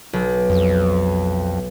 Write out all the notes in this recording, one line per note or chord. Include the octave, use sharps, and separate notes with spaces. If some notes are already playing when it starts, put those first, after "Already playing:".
B1
F2